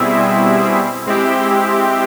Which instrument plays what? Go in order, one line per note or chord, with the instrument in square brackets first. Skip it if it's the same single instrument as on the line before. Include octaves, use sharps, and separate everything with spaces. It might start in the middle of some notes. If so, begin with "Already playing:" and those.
Already playing: [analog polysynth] B2 G3 C4 E4 G#4
G#3 C4 E4 G4